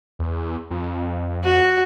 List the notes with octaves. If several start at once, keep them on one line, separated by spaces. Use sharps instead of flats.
E2
F2
F#4